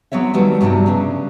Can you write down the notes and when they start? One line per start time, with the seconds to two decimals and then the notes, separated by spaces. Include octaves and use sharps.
0.12 F#3 B3 C4 C#5 E5
0.33 D#3 F#3 G3 A3 B3
0.61 G2 C3 F#3 A3 D4 D#4
0.86 C#3 B3 D4